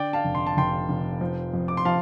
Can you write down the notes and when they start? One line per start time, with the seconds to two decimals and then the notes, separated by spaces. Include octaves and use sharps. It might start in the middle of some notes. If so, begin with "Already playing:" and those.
Already playing: D3 D5 G5
0.13 F5 A5
0.24 F1
0.35 C6
0.47 A5
0.57 F1 G5 C6
0.89 F1
1.21 F3
1.53 F2
1.68 D6
1.77 C6
1.85 F3 F5 A5